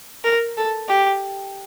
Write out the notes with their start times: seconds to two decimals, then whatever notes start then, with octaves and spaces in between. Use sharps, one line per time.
0.25 A#4
0.57 A4
0.88 G4